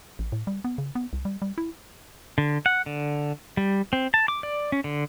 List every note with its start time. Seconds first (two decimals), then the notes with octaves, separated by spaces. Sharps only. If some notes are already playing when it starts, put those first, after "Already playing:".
0.19 A1
0.32 A2
0.47 G3
0.64 B3
0.78 C#3
0.95 B3
1.13 C2
1.25 G3
1.42 G3
1.58 E4
2.38 D3
2.66 F#5
2.86 D3
3.57 G3
3.93 C4
4.14 A5
4.28 D6
4.43 D5
4.72 C#4
4.84 D3